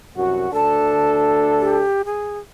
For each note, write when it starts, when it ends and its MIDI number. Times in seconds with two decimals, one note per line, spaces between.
0.16 0.48 36
0.16 0.48 42
0.16 0.48 66
0.52 1.83 38
0.52 1.83 62
0.52 1.83 69
0.52 1.36 81
1.60 2.02 67
2.05 2.39 68